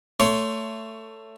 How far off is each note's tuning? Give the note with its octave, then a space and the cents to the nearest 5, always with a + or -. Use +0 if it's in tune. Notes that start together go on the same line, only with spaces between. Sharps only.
A3 +15 C#5 +20 C6 +0